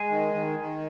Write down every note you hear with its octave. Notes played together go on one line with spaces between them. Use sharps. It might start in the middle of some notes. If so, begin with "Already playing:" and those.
Already playing: G#3 G#4
D#3
D#3
D#3